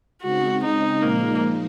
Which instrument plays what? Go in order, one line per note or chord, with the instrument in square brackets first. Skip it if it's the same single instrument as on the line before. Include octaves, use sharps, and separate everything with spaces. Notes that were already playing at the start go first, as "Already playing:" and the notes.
[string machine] C#3 G#3 C4 D#4 [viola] F#4
[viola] D#4
[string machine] A#2 F3 G#3 D#4 [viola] A#3